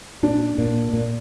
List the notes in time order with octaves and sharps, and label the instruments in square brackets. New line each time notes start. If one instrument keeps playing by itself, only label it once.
[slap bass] A#2 [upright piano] D4
[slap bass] A#2
A#2